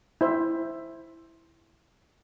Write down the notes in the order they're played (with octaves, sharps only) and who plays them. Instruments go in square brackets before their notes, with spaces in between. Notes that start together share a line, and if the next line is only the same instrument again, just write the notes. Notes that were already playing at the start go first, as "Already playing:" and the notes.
[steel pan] E4 C5 E5